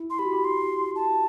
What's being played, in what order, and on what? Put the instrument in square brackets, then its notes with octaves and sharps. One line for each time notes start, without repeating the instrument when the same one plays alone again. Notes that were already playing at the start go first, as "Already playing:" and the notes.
Already playing: [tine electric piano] E4
[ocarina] C6
[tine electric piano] G4 [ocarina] B5
[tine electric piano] F#4
G4
[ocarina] C6
A5